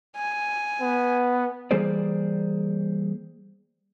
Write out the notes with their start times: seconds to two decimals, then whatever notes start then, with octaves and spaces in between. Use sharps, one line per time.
0.16 G#5
0.81 B3
1.71 E3 G3 A#3 G#4 C5 D5